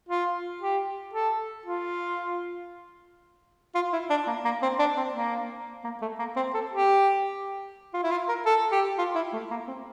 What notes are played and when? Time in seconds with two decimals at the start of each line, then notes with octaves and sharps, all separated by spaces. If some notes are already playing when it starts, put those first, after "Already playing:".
0.09 F4
0.61 G4
1.14 A4
1.66 F4
3.75 F4
3.93 E4
4.10 D4
4.27 A#3
4.45 A#3
4.62 C4
4.79 D4
4.97 C4
5.14 A#3
5.84 A#3
6.02 A3
6.19 A#3
6.36 C4
6.54 A4
6.72 G4
7.94 F4
8.03 E4
8.11 F4
8.29 A#4
8.46 A4
8.72 G4
8.98 F4
9.16 E4
9.33 A3
9.51 A#3
9.68 C4